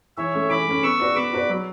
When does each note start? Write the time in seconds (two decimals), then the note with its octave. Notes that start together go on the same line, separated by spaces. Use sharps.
0.17 E3 C#5 E5
0.34 A3 C#4
0.50 E3 B5 D6
0.67 A3 C#4
0.83 B3 C#6 E6
1.00 F#4 B4 D5
1.15 B3 B5 D6
1.33 F#4 B4 D5
1.49 F#3